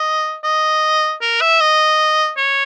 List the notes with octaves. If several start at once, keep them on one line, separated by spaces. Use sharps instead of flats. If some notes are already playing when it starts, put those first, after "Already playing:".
Already playing: D#5
D#5
A#4
E5
D#5
C#5